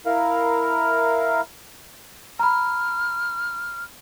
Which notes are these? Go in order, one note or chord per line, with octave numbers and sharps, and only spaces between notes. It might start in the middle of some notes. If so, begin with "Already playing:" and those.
E4 A#4 F5
A#5 B5 F6